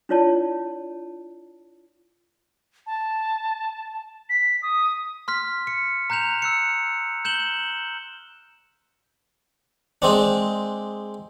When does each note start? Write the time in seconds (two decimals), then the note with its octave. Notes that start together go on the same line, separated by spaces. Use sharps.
0.09 D4 E4 F4 C#5 D5 A5
2.86 A5
4.29 B6
4.62 D#6
5.28 C6 F6 B6
5.67 C#7
6.10 A#5 F#6 G6 E7 F7
6.42 E6 F#6 C#7
7.25 G6 E7 F#7 G7
10.02 G#3 C4 D4